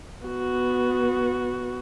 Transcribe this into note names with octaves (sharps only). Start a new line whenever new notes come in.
B3 F#4